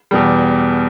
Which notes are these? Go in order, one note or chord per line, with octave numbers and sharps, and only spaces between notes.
E2 B2 G3